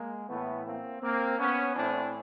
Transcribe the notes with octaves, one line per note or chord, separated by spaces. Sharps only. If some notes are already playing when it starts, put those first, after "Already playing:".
Already playing: G#3 A#3
A2 E3 A3 B3
A#3 C4
A#3 C4
B3 C#4
A2 E3 C4 D4